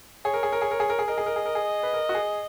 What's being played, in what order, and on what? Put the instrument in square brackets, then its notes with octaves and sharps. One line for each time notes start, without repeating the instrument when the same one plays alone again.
[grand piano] G#4 [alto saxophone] C#5
[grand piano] A#4
G#4
A#4
G#4
A#4
G#4
A#4
G#4
[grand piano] A#4 [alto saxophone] D#5
[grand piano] G#4
A#4
G#4
A#4
G#4
B4
A#4
F#4
G#4